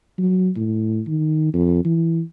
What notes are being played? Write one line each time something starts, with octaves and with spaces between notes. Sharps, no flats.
F#3
A2
D#3
F2
E3